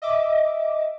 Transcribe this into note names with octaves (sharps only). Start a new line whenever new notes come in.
D#5 E5 D6